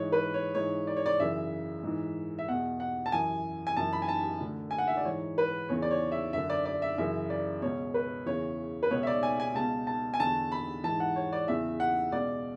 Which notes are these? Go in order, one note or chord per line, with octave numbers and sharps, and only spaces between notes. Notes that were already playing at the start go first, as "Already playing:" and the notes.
Already playing: G#2 E3 C#5
B4
C#5
G#2 E3 C#5
D5
C#5
D5
F#2 C#3 E3 E5
G#2 E3
E5
E2 B2 F#5
F#5
A5
F#2 E3 G#5
G#5
F#2 E3 A5
B5
G#5
A5
D2 D3
G#5
F#5
E5
D5
G#2 E3 C#5
B4
E2 C#3 E3 C#5
D5
C#5
E5
F#2 D3 E5
D5
D5
E5
F#2 C#3 E3 E5
D5
C#2 B2 C#5
B4
E2 C#3 E3 C#5
B4
C#2 B2 C#5
E5
D5
G#5
G#5
C#2 B2 A5
A5
G#5
E2 D3 A5
B5
G#2 E3 A5
F#5
C#5
D5
E2 C#3 E3 E5
F#5
C#2 B2 D5